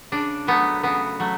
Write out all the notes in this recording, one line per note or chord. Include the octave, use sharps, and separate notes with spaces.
C#3 D4
F#3 A3 B3
C#3 B3
F#3 A3